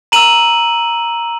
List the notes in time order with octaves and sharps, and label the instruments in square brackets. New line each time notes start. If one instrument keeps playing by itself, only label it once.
[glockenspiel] A#5 E6 D#7 F#7